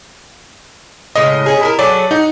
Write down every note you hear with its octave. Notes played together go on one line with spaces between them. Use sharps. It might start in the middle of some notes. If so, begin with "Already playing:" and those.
A2 C#3 G#3 D#5
C#4 G#4
E4 A4 A#4
F#3 A3 G#4 D5
D#4 F#5